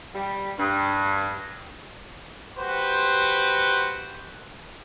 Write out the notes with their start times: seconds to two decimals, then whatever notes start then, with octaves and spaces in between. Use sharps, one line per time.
0.14 G3
0.59 G2
2.58 F#4 G4 B4 C5